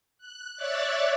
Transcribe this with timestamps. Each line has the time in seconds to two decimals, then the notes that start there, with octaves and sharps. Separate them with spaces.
0.18 F#6
0.57 C#5 D5 E5 F#6 A6